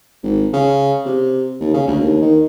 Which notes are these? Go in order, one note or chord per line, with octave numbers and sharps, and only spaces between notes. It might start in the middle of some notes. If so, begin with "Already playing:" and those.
G#1
C#3
C3
D#2
C#3
D2
D#2
D#3